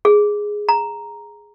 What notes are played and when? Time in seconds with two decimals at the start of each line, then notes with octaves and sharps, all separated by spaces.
0.05 G#4
0.69 A#5